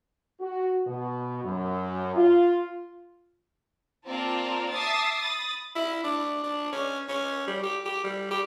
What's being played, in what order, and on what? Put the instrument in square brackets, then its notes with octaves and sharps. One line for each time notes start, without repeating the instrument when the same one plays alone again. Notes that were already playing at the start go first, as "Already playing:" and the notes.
[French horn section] F#4
B2
F#2
F4
[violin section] A#3 C4 F4 A#4 D5 A5
E5 A5 D6 D#6 A6 C7
B5 D#6 A6
[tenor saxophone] E4
D4
D4
C#4
C#4
G3
G4
G4
G3
G4